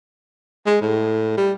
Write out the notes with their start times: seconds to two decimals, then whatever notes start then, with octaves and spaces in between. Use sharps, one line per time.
0.66 G#3
0.82 A2
1.37 G3